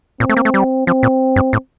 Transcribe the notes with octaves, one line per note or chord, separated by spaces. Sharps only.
A#2 C4
A3
A#3
A3
G3
F3 C4
A#2
G2
A2